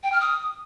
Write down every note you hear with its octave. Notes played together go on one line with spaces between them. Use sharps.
G5
F6
D#6